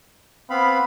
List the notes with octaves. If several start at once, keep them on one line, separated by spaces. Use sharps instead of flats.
B3 C4 F5 B5